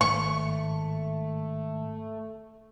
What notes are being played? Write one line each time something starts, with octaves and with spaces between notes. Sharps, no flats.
G#1 A3 C#6